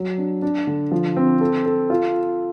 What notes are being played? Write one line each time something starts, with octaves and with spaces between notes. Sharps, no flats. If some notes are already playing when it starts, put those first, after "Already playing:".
Already playing: F#3
D4
D4
D3
F3
C4
A4
A4
F4